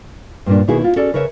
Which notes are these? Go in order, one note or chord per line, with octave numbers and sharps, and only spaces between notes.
G2 A#2 A#3 D4
B2 D#3 A#3 E4 F#4 G#4
E4 F4
C#4 F#4 G#4 A4 D5
C#3 A#4 B4 C#5 E5